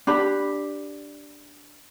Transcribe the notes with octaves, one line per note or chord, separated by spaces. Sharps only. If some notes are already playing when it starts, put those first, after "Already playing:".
D4 G4 B5